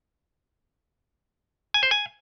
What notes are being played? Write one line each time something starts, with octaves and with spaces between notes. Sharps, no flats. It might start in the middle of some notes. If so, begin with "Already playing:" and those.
G#5
C5
G#5